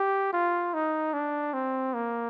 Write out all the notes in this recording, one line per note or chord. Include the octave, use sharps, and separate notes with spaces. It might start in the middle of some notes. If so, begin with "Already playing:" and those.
Already playing: G4
F4
D#4
D4
C4
A#3